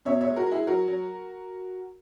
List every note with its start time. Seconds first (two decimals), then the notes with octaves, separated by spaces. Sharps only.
0.05 B2 C#5 E5
0.21 C#5 E5
0.27 G#3
0.36 F#4 A#4
0.46 G#3
0.51 E4 G#4
0.67 F#3 F#4 A#4
0.88 F#3